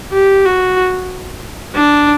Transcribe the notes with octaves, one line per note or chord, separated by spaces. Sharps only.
G4
F#4
D4